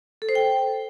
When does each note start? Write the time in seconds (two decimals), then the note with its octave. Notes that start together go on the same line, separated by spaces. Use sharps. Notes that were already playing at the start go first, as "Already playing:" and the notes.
0.22 A4
0.29 C5
0.35 G5